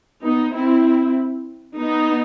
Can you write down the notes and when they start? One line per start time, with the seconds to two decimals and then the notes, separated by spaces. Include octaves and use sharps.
0.24 B3 D#4
0.54 C4 E4
1.78 B3 D#4